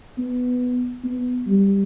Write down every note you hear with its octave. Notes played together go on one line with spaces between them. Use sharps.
B3
B3
G3